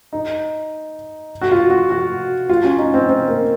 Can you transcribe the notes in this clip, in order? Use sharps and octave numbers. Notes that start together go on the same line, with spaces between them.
D#4
F#4
F4
F#4
F#4
F4
C#4
D#4
C4
C4
A#3